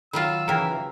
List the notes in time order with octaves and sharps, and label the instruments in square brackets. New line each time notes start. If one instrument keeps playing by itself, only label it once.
[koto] D#3 F#3 F4 [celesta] F#4 B5 [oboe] E6
[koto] C#3 A#4 [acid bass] E3 [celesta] F4 G5 A#5